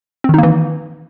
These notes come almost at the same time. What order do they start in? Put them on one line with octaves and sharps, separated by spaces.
C4 D#3 D#4 A#3 E3